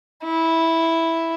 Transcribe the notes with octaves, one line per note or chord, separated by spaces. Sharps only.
E4